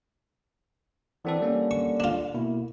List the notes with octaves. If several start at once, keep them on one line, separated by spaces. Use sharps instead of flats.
D3 E3 C4 A4
G3 A#3 C#4
C#6
D4 F4
B2 A#3 E4